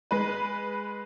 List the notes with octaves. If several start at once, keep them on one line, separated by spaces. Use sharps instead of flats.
G#3 B4